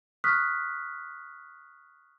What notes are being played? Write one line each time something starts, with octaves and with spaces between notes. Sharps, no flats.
C#6 D#6 F6 F#6 B6